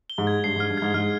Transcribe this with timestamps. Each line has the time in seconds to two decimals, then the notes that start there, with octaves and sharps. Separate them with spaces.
0.10 G7
0.18 G#2
0.27 G#6
0.44 G2 C7
0.56 G#2
0.60 F6
0.70 G2
0.77 G#2 G#6
0.94 G#2 F6